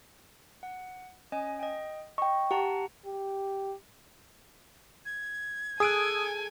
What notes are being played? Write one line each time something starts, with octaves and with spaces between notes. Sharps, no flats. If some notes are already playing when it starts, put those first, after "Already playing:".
F#5
C#4 D#5 G#5
D#5 G5
D#5 G5 C#6
G4 F#5 A5 A#5
G4
G#6
G#4 A4 G#5 D#6 E6 F#6 D7